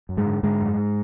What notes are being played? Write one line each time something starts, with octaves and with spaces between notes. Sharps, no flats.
F#2
G#2 G#3
D3
G#2 D3 G#3
F#2